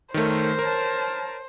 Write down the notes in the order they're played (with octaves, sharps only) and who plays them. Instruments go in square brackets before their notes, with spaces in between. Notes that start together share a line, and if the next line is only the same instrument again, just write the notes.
[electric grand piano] D#3 A3 [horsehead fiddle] A#4 C#5 [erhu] C5
[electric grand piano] A#4 [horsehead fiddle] C#5 A5